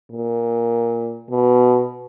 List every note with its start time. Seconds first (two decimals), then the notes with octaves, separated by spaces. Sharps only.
0.12 A#2
1.30 B2